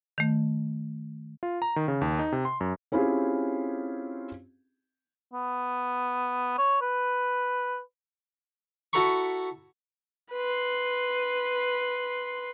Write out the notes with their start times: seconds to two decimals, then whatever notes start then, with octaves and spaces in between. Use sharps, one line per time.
0.18 D#3 A3
1.43 F4
1.62 A#5
1.76 D#3
1.88 C#3
2.01 D#2
2.19 D#4
2.32 C3
2.45 C6
2.61 F#2
2.92 C4 C#4 E4 F4 G4 G#4
5.33 B3
6.58 C#5
6.81 B4
8.93 E4 F#4 A4 A#5 B5 C#6
10.32 B4 C6